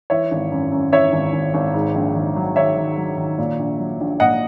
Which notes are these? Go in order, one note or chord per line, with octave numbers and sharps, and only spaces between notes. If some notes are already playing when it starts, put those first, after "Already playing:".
E3 C#5 E5
G#1
F#2
F#2
E3 C#5 E5
G#1
G#1
G#1
G#2
A#1
D#3
F#3
D#3 C#5 E5
D#3
F#3
D#3
A#2
A#1
F#3
A#1
A#2 D#5 F#5